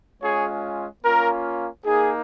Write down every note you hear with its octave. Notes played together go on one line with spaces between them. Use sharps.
G#3 C#4 F4 G#4 C#5
A#3 C#4 F4 A#4
A#3 D#4 G#4